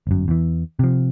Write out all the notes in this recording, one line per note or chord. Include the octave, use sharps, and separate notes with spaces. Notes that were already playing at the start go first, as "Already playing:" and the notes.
G1 F#2
E2 E3
C3 F3